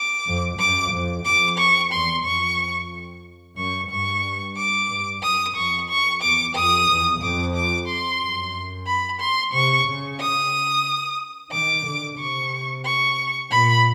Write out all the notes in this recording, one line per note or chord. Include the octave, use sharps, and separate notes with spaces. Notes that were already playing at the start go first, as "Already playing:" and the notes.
Already playing: D6
F2
F#2 D6
F2
F2 D6
C#6
E2 C6
F2 C#6
F#2 C#6
G2 C#6
D6
G2
F#2 D#6
F2 C#6
C#6
E2 D6
F2 D#6
E2
F2 D6
D6
C6
F#2
B5
C6
C3 C#6
C#3
D#6
D#3 D6
D3
C3 C#6
C#6
A#2 B5